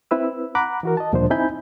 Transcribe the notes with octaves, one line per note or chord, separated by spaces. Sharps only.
C4 E4 B4 E6
F#5 A#5 B5 D6 F#6
E3 F#4 A#4
D#5 A5
D2 A#2 F3 G3 D4 C5
C4 D#4 E4 G#5 B5 G6